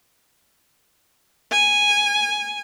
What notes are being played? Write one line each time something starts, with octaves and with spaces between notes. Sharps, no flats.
G#5